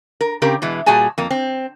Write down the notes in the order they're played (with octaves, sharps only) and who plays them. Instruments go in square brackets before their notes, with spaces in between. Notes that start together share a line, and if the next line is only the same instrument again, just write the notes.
[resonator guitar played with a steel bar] A#4
C#3 C4 G4 A#4
B2 E3 G#3
A#2 G3 F#4 G#4 G#5 A5
F2 A#3
C4